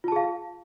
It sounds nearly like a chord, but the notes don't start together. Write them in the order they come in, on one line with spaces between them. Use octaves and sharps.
F4 A5 G#4 F5